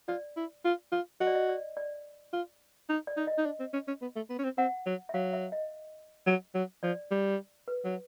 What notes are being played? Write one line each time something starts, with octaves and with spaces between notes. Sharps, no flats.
F4 D5
E4
F4
F4
F#4 D#5
D5
D#5
D5
D5
F4
D#4
D5
D#4
D#5
D#4
D4
C4
C#4
C#4
B3
A3
B3
C#4
C4
C4 F#5
F#3
E5
F#3 F5
E5
D#5
F#3
F#3
F3 D5
G3
B4
F#3